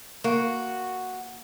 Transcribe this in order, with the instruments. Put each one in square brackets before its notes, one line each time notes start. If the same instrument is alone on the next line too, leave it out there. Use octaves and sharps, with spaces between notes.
[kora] A#3 [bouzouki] F#4